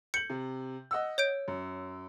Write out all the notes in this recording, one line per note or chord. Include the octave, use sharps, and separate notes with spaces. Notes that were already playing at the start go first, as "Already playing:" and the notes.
G6 C#7 F#7
C3
D#5 F#5 E6
C#5 G6 D7
F#2